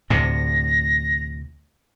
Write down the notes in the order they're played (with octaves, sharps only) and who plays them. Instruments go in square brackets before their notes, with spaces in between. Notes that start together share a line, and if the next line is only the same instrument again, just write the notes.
[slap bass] D2 A2 C3 [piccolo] A#6